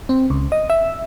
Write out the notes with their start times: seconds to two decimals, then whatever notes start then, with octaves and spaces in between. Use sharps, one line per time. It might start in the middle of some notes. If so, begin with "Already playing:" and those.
0.09 C4
0.30 C#2
0.52 D#5
0.70 E5